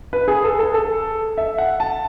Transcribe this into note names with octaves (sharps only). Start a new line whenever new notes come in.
B4
G#4
A4
A4
A4
E5
F#5
A5